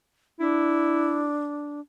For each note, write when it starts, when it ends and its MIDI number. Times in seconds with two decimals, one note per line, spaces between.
0.40 1.80 62
0.40 1.29 64